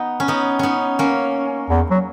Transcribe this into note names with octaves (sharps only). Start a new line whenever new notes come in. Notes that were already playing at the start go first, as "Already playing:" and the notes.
Already playing: B3 D#4
C#4
B3 D#4
B3 C#4 D#4
A#3 C#4
E2
F#3